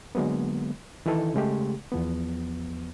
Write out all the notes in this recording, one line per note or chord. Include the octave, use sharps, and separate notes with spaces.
D3 F#3 G#3 A#3 B3
D#3 E3 D#4 E4 A4
C#3 G#3 A3 G4
E2 F3 B3